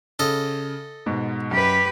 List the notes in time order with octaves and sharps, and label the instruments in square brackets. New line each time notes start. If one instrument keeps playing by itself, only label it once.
[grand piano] C#3 [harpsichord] A4 D#5
[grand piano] G#2 B2
[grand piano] F#2 [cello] G4 B4